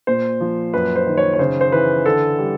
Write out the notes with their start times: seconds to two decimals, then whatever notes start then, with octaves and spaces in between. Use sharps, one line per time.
0.07 A#2 C5
0.41 F3
0.73 F#2 B4
0.96 C5
1.07 D#3
1.17 C#5
1.33 C#5
1.39 C#3 C5
1.61 C5
1.72 E3 B4
2.06 D3 A4
2.38 G3